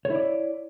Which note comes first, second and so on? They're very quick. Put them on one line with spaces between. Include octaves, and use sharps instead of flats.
C#5 E4 D5